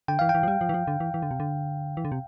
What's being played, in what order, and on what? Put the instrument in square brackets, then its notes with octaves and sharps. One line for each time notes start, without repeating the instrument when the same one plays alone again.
[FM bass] D3 [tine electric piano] G5
[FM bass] E3 [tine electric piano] F5
[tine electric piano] G5
[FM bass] E3
F3
G3
F3
E3
F3
D3
E3
E3
D3
C3
D3
E3
D3
C3